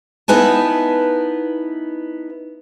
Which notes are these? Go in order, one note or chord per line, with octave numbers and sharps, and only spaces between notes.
B3 D#4 E4 B4 G#5 A5